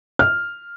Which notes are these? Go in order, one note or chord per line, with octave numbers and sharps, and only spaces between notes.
F6